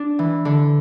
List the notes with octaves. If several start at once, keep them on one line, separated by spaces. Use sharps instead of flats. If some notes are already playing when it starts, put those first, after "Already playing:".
Already playing: D4
E3
D3